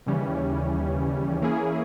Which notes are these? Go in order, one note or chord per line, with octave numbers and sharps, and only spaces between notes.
D#2 C#3 E3 G3 C#4
E3 A#3 C#4 E4 G#4